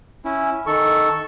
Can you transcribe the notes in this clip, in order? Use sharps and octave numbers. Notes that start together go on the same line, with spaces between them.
C#4 E4
D#3 A4 C#6